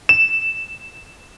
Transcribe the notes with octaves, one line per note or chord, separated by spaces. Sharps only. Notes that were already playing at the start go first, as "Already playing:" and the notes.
E7